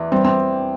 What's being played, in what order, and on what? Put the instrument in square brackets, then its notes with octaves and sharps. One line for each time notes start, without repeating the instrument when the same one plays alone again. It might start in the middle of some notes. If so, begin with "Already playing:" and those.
Already playing: [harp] E2 E3 D4
[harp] G3 [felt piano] C4
[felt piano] C4